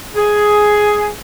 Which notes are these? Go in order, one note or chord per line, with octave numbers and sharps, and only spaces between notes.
G#4